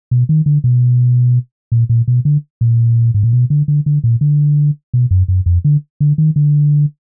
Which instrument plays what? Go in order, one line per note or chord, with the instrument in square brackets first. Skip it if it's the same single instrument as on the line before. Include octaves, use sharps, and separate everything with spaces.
[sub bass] B2
D#3
D3
B2
A#2
A#2
B2
D3
A#2
G#2
A#2
B2
D3
D3
D3
A#2
D3
B2
F#2
F#2
F2
D3
D3
D#3
D3